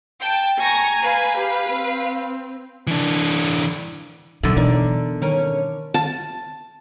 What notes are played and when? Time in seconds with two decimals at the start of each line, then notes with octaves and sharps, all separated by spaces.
0.19 G5 A5
0.59 G#5 A#5 C#6 A#6
1.01 B4 F5
1.38 G4
1.70 C4
2.87 E3 D4
4.43 B2 D3 D#3 F#3 E4
4.57 B2 E3 D#4 A#4 D5
5.22 D#3 C#4 A#4
5.94 A5